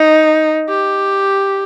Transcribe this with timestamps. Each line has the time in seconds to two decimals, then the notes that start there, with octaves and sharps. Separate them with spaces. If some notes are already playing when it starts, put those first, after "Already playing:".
Already playing: D#4
0.68 G4